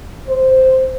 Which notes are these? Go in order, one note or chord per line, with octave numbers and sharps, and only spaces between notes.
C5